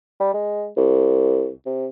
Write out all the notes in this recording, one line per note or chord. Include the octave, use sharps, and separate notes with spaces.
G3
G#3
C2
C3